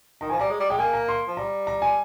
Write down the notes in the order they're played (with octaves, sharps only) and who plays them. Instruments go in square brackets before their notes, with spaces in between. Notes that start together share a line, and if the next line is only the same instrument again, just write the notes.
[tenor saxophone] D#3 [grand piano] A#5
[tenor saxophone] F3 [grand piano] G#5
[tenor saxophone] G3 [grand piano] A#5
[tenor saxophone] G#3
G3
[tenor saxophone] G#3 [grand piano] G5
[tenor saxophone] A#3 [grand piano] G#5
[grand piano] A#5
C6
[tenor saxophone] F3
[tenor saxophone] G3 [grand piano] A#5
[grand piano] A#5
G#5